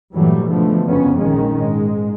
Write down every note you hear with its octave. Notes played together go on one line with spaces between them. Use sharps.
G2 A#2 E3 F#3 G3 A3
G#2 B2 D3 E3 F3 A3
F#1 F2 B3 C#4
A#1 D#3 G#3 C#4
G#2 G#3